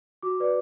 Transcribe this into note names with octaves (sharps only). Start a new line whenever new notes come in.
F#4 D6
B4 D5